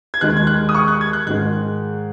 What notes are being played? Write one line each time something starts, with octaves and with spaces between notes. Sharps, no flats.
G#6
D#2 D#3 G#3 F#6
G#6
F#6
D#6
C#6
F#6
G#6
F#6
G#2 D#3 G#3 F#6